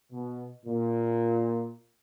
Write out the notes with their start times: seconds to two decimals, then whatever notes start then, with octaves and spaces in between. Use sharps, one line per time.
0.12 B2
0.66 A#2